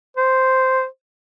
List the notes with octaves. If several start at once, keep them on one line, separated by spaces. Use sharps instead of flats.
C5